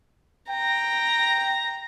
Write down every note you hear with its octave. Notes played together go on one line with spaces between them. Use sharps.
G5 A#5